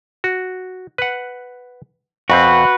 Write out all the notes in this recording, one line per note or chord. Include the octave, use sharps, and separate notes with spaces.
F#4
B4 F#5
F2 C4 F#4 B4